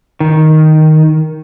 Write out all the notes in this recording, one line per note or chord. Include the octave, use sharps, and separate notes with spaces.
D#3